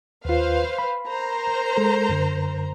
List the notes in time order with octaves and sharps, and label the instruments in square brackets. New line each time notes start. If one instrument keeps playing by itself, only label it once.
[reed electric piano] D#2 F4 [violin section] B4 C5 F5
[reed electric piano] B5
[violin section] A#4 C5 A#5
[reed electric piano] G#3 A4
F#2 D3